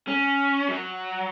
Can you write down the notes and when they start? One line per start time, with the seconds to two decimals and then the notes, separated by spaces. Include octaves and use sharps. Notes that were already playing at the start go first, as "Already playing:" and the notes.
0.08 C#4
0.68 F#3